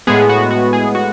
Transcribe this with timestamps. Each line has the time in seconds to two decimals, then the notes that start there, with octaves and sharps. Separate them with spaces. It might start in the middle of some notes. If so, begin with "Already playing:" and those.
0.07 A2 G#3 B3 G#4
0.29 F#4
0.51 F#4
0.73 G#4
0.95 F#4